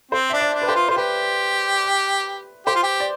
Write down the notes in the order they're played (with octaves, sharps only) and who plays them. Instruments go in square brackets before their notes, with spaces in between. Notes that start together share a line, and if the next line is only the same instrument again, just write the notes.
[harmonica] C4 [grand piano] C5
[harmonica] D4 [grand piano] E5
[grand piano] D5
[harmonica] D4
[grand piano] B4
[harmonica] G4 [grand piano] C5
[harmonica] F4
[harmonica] F4 [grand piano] C5
[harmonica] G4 [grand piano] B4
[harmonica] G4 [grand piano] C5
[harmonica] F4
G4
[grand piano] D5